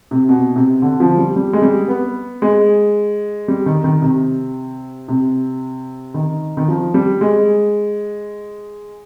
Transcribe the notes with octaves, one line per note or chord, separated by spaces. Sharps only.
C3
B2
C3
D3
F3
G3
G3
G#3
G3
B3
G#3
G3
D#3
D#3
C3
C3
D#3
D#3
F3
G3
G#3